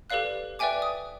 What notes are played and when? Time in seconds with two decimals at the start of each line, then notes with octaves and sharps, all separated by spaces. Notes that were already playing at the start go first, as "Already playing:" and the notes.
0.10 G4 A4 B4 D5 F5 F#6
0.59 B4 D5 E5 G5 G#5 D6
0.82 D#6